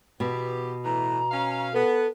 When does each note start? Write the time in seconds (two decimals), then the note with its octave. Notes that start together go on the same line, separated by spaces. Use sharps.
0.20 B2 E3 B3 G4
0.84 A2 E3 A#5
1.31 C#4 F5
1.74 B3 A4 B4